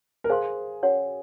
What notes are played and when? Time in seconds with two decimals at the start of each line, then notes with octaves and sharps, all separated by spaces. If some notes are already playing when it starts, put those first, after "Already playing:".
0.24 A#4
0.29 G#4 C5 F5 G#5 C6
0.83 C#4 F#4 A#4 C#5 F#5